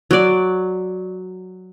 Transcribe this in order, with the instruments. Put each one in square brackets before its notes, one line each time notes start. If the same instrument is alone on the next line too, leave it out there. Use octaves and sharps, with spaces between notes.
[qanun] F#3 D5